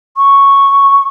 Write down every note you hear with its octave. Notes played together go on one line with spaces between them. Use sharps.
C#6